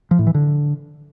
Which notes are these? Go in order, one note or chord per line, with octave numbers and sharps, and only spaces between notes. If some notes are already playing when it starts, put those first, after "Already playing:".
F3
A2
E3
D3